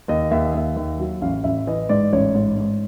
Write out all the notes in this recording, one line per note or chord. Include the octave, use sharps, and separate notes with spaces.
D#2 D#5
D#2 E5
D#5
D#2 E5
D#2
F#3
A1 F5
A1 E5
E3 D#5
G#2 D5
A1 C#5
G#2
G#2